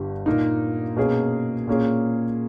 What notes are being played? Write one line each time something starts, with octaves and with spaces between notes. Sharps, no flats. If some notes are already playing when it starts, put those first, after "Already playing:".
Already playing: G1 G2 G3
A#2 A#3 D#4
B2 A#3 C#4 G#4
A#2 A#3 C#4 G#4